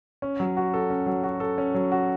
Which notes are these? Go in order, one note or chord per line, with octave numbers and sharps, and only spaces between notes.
C#4
F#3
F#4
A4
C#4
F#3
F#4
A4
C#4
F#3
F#4